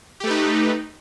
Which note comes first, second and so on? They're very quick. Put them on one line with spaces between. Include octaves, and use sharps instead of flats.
G4 A3 B4 D#4